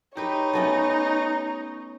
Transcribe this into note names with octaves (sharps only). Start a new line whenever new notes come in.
D#4 G4 B4 C#5
A3 B3 C#4